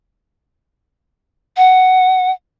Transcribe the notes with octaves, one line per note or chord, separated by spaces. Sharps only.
F#5